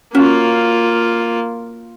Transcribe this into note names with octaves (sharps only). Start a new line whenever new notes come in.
A#3 C#4 F4 F#4